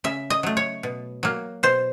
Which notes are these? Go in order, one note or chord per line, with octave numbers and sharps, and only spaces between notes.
C#3 E5
D#5
F#3 A3
C#5
B2
F#3 A#3
B2 C5